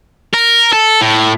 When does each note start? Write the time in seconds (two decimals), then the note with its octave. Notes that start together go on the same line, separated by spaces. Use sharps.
0.34 A#4
0.73 A4
1.01 A2